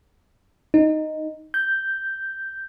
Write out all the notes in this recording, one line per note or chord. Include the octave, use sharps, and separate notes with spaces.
D#4
G6